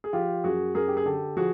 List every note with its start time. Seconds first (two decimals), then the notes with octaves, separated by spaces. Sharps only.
0.04 G#4
0.13 F3 F4 G4
0.44 F#2 F#4 G#4
0.75 F#2 G#4 A#4
0.88 G4
0.97 G#4
1.05 D3 G4 A4
1.37 F3 F#4 G#4